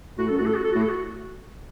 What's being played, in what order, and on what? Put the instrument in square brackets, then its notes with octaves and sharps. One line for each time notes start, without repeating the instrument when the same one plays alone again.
[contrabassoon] A2 [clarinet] F#4
[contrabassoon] F#2 [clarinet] A4
[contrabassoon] A2 [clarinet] F#4
[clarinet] A4
F#4
A4
[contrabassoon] A2 [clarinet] F#4
[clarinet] A4
F#4